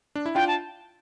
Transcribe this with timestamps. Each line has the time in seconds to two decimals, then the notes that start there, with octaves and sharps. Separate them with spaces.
0.15 D4
0.26 E4
0.35 D4 F4 G5
0.47 A5